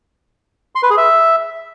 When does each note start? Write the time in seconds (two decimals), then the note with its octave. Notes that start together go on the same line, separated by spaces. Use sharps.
0.75 C6
0.83 B4
0.90 G#4
0.98 E5